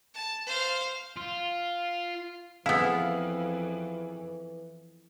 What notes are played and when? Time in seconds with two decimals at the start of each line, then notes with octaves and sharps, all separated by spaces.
0.14 A5
0.47 C5 F5
1.16 F4
2.66 F2 E3 B3 E4 G#4 E5 F5